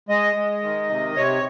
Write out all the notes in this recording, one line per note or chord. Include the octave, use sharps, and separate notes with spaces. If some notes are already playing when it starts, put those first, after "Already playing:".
G#3 D#5
G#3
D#3
C3
C3 C#5